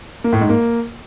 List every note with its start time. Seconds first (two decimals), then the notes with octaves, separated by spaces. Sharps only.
0.24 A#3
0.33 A2
0.41 G#2
0.49 A#3